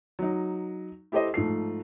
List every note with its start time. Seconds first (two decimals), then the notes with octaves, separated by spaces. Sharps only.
0.19 F#3 D#4
1.12 E4 G4 A4 C5 D#5
1.34 G#2 F3 A3 C7